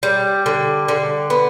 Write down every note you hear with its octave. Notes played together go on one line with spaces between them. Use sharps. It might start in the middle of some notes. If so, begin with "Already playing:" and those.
G3
D3
D3
B3